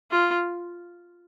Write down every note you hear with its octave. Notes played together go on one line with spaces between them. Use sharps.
F4